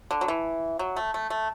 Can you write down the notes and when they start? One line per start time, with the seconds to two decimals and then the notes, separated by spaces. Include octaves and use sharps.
0.11 D3
0.21 F#3
0.28 E3
0.79 F#3
0.96 A3
1.14 A3
1.30 A3